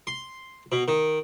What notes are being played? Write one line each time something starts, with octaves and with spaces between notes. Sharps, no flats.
C6
B2
D#3